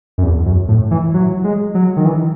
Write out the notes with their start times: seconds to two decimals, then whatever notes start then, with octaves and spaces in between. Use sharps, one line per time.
0.18 F#2
0.23 E2
0.46 F#2
0.68 A2
0.91 E3
1.14 F#3
1.44 G#3
1.75 F#3
1.97 D#3
2.05 E3